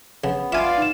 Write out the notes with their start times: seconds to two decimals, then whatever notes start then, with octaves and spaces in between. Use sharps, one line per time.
0.24 C#3 B3
0.52 F4 D5 E5 F5 G#5
0.78 D#4 E7